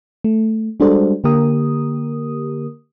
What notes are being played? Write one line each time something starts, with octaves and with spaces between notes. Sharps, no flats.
A3
G3 G#3 D4 F#4 A4 C5
D3 A#3 G4 A#4 D#6